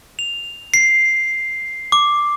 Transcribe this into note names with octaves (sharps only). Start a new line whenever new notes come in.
F7
C7
D6